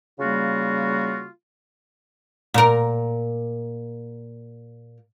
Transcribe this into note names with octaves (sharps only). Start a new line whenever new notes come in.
C#3 G3 A#3 F4 F#4
A#2 A#4